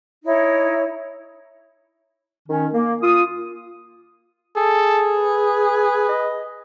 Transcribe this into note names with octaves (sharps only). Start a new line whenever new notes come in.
D#4 E4 C#5
D#3 C#4
A#3
F4 D#6
G#4 A4
B4
D#5